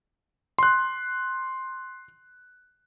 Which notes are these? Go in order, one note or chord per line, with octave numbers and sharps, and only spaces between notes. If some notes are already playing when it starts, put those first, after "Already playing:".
C6 F#6